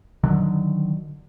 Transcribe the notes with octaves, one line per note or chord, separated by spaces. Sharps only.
D3 D#3 F#3